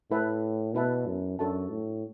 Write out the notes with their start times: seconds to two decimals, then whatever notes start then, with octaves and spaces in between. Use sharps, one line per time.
0.11 A2 E4 B4 E5 A5
0.75 B2 E4 B4 E5 A5
1.07 F#2
1.39 F#2 D4 F#4 A4 E5 A5
1.71 A2